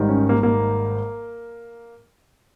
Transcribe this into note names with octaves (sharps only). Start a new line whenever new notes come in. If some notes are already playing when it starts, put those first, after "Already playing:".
Already playing: G#1 G#2 D#3 G3
C#4
A#3
A#3